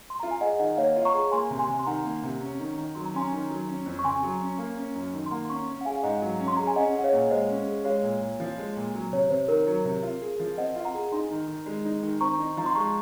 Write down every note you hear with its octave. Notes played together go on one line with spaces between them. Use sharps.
C6
F4 A#5
G#5
G#4 D#5 F#5
D#3 D#5 F#5
A#3 C#5 F5
F4
A#5 C#6
G#4
A#3 G#5 C6
C3
G#5 C6
C3
C6
D#3 F#5 A#5
A#3
C3
C#4
D#3
D#3
F#3 C6
A#5
C#4 G#5 C6
D#3
F#3
C#4
F2
C#6
C#3 G#5 C6
F#3
C#4
A#3
C#4
F#2
D#3
C6
A#3 F#5 A#5
C6
C#4 A#5 C#6
C#4
F#5
G#4 F5 G#5
F5
G#2 D#5 F#5
F#3
C#4
C6
G#4 A#5
G#5
C#4 D#5 F#5
G#4 F#5
C#5 F5
A#2
G#3 C5 D#5
C#4
G#4
G#3 C#5 F5
A#2
A#2
F3
G#3
A#2
F#3
C3 C#5
C3 C5
D#3 A#4
F#3
C3
F4
G#4
F3
C4 D#5 F#5
F4
F#5 A#5
G#4
D#4 G#5 C6
D#3
D#3
G#3
D#4
D#3
C4 A#5 C#6
D#4
F3 A#5
C6
G#3 A#5 C#6